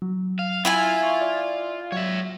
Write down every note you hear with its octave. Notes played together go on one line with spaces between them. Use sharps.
F#3
F5
E4 F4 E5 G#5
C#6
D5
F#3 C#5 E5